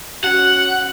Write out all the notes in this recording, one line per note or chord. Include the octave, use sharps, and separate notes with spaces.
C#4 F#4 F#5